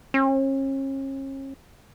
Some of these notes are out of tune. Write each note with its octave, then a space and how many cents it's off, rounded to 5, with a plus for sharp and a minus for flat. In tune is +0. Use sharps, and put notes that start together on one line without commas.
C#4 -40